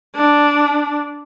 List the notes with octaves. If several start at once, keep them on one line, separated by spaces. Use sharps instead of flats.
D4